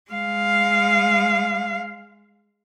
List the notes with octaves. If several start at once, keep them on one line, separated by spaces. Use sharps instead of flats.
G#3 F5